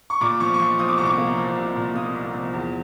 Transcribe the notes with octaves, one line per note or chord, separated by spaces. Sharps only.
C#6
A#2 D6
F3 C#6
C#6
F3 C6
F3 D#6
D6
C2 C#6
D6
A#3
F3
C2
A#2
A#3 D#6
C2
F3
E2